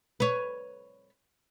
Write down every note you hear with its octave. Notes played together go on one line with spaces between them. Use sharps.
B4 C#5